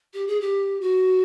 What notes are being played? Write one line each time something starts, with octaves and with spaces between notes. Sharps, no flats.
G4
G#4
G4
F#4